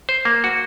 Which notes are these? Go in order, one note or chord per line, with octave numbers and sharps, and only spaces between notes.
C5
A#3
F#4